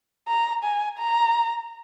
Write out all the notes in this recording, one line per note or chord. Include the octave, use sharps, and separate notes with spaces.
A#5
G#5
A#5